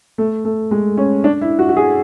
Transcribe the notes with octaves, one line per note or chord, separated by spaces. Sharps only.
A3
A3
G#3
C#4
D4
E4
F#4
F#4
G#4